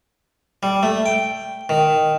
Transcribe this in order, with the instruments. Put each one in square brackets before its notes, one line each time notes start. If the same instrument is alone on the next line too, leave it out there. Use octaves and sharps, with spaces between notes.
[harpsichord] G3
A3
G5
D#3